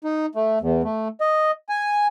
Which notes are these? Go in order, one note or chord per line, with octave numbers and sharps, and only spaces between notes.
D#4
A3
E2
A3
D#5
G#5